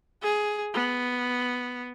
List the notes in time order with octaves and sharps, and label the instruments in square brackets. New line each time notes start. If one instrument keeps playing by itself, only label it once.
[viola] G#4
B3